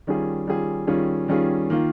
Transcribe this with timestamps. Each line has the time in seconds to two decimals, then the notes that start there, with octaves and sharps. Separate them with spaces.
0.07 D#3 G3 C#4 F4 G#4
0.47 D#3 G3 C#4 F4 G#4
0.87 D#3 G3 C#4 F4 G#4
1.28 D#3 G3 C#4 F4 G#4
1.70 D#3 A#3 F4